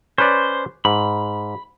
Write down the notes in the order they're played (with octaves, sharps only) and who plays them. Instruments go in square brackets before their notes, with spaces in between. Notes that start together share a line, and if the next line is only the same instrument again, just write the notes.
[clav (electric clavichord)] C#4 B4 D5 [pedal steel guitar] C5
[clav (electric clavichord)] G#2 [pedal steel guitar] B5